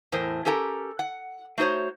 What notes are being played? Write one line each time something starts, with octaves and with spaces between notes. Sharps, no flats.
E2 A2 A#4 C5
C#4 G4 A4 A#4 G5 A#5
F#5
A3 D#4 F#4 C5 C#5